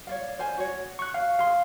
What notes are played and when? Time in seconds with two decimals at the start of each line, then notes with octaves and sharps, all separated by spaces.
0.07 C#5 D5 F5
0.39 C5 F5 G#5
0.58 F#4 C#5
0.99 C#6 F#6
1.14 F5
1.39 G#4 F5 C6